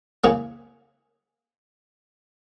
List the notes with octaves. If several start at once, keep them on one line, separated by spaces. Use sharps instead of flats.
C#3 E3 A#3 C#4 G#4